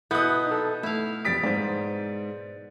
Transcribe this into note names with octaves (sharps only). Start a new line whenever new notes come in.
B2 B3 E4 D#6 F#6 G6
D#4 A4
A3 E4 F5
F2 G3 D#6 A6 B6 D7
G#2 C5 D5